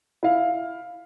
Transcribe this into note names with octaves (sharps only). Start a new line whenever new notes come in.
E4 F5